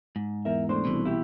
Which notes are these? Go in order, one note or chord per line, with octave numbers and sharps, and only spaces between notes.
G#2
E2 A#4 E5
A3 D4 C5
C2 B2 E3
E4 G4